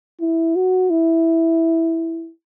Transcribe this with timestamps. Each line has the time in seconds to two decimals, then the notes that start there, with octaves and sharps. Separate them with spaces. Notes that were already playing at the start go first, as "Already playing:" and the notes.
0.21 E4
0.56 F#4
0.90 E4